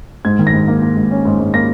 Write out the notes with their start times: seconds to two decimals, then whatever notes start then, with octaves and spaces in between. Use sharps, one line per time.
0.25 G#2 G#6
0.39 D#3
0.47 A#6
0.53 G#2
0.68 A#3
0.82 A#3
0.96 G#2
1.11 C#4
1.25 G#2
1.39 G#2
1.54 A#3 A#6